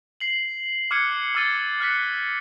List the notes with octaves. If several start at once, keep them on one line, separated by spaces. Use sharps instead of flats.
C7 F#7
D6 F6 F#6 G#6 C#7 D#7
D6 E6 F6 A6 D#7 G7
F6 F#6 B6 C#7